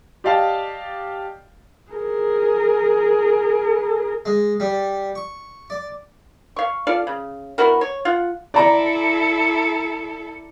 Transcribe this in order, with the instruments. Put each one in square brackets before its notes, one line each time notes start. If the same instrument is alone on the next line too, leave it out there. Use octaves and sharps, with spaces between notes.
[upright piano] G4 D5 D#5 F5 G5 A5
[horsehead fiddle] G#4 A#4
[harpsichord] G#3
G3
C#6
D5
[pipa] F5 C#6
F4 A4 D5 F5
C#3
B3 E4 F#4 A#4
C#5
F4 F#5
[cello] E4 A4 [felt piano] D5 A#5